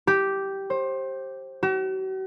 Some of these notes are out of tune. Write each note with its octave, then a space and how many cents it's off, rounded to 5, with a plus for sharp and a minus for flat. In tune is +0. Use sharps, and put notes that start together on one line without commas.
G4 -5
C5 +25
F#4 +45